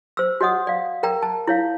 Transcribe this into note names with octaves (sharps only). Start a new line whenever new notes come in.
C5 E6
F#4 C#5 D#5 F#5 D#6
D5 F5
A#4 D5 G5 A#5
A5
E4 C#5 F5